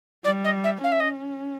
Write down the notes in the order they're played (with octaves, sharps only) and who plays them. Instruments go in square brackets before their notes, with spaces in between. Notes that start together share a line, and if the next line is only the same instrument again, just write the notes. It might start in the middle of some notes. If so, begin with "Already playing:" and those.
[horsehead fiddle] G3 [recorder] D5
[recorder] D#5
E5
[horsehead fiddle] C#4 [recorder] F5
[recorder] E5
D#5